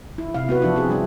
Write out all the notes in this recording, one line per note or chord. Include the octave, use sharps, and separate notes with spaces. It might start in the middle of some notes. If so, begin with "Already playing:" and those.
E4
C3 E4 F5
B3 F#4 B4
F3 D4 E4
C4 G#4
G3 D4 E4